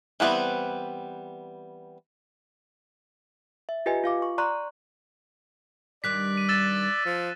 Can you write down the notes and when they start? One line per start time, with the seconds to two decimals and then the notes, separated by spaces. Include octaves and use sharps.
0.20 E3 G3 B3 C4 E5
3.69 E5
3.86 F4 G4 B4 D#5 G#5
4.04 F4 F5 D6
4.22 C#6
4.38 D5 A#5 C6 C#6 F#6
6.04 G2 D#3 G3 D5 F#6 B6
6.37 D#7
6.49 E6 A6 E7
7.06 F3